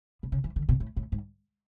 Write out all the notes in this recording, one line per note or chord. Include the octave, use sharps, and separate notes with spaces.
B2
C#3
E3
D3
B2
A2
A2
G#2